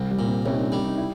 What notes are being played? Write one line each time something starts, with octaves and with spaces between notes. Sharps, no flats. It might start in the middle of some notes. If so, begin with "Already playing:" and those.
Already playing: C2
G3
A#2
C4
C2 C#4
D#4
D4
G3 D4
D#4
E4